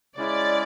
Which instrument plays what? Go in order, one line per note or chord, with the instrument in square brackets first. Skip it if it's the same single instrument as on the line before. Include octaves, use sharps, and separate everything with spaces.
[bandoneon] C#3 G#3 C#4 E4 [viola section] D5